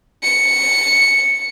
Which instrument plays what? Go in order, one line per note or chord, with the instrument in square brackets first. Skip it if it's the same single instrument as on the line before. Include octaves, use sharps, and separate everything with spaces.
[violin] C#7